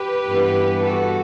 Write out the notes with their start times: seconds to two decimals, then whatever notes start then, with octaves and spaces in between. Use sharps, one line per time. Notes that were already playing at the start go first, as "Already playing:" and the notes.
Already playing: G4 B4
0.27 G2 E3 B3
0.81 F#4 A4